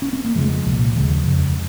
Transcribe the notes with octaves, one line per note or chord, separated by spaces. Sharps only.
C#4
C4
A#3
F2 C#3 F3 G#3
C2 A#2
D#2 C#3 F3 G#3
F2 C#3